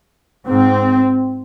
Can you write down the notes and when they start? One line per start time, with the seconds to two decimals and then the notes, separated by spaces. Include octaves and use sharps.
0.46 G#2 C4